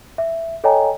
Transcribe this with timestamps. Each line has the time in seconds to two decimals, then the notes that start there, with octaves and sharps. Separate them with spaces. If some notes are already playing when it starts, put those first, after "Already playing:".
0.18 E5
0.64 A4 C#5 D#5 G5 G#5 A#5